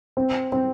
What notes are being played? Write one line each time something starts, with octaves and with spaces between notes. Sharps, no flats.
C4
C4